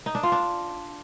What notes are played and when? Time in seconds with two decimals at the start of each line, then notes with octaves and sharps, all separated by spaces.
0.06 D#4
0.15 D4
0.23 F4
0.32 D4